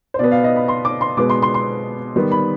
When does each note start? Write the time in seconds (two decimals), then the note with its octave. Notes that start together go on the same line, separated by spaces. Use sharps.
0.14 C5
0.19 B2 B3 D5
0.32 F5
0.44 D#5
0.56 B5
0.68 C6
0.85 D6
1.01 C6
1.17 B2 G#3 B3 D6
1.30 C6
1.42 C6
1.54 C6
2.16 D#3 G3 B3
2.32 B5